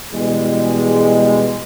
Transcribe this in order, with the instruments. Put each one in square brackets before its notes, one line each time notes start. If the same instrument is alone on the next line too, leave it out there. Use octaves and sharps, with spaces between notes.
[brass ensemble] B2 E3 G3 G#3